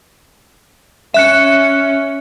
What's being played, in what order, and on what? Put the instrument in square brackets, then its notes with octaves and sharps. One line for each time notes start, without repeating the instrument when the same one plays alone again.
[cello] C#4 [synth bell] E5 F#6 C#7